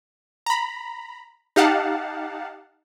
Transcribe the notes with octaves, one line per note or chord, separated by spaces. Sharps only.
A#5 B5
D#4 G4 F5 F#5 A5